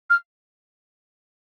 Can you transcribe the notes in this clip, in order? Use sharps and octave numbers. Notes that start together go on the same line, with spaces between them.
F6